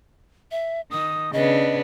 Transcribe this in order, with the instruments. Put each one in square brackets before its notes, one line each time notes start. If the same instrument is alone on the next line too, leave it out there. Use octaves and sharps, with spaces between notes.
[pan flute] E5
[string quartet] D#3 [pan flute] D#6
[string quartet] C#3 B3 D4 [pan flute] D#5